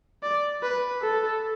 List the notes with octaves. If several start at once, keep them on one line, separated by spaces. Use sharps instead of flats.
D5
B4
A4